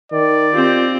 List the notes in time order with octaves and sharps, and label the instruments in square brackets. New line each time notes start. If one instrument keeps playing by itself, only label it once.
[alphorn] D#3 [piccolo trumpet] D5
[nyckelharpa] C4 G4 [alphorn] F4